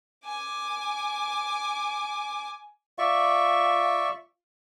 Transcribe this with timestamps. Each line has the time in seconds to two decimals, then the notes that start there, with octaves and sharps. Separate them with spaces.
0.25 G#5 D6
2.98 F4 D5 E5 C#6